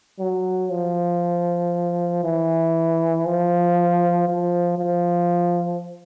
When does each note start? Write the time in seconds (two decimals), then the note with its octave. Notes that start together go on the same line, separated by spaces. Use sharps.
0.19 F#3
0.70 F3
2.24 E3
3.26 F3
4.28 F3
4.78 F3